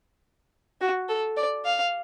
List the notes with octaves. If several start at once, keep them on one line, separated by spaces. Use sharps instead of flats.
F#4
A4
D5
F5